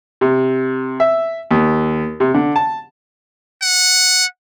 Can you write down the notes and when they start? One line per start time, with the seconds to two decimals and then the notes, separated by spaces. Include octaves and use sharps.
0.21 C3
1.00 E5
1.51 D#2
2.20 C3
2.34 D3
2.56 A5
3.62 F#5